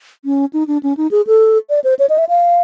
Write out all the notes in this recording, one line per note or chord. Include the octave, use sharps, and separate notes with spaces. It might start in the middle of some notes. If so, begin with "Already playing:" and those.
C#4
D#4
D4
C#4
D#4
G#4
A4
D5
C5
C#5
D#5
E5
F5